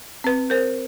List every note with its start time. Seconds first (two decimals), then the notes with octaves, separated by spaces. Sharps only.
0.24 C4 B4
0.50 A#4 C5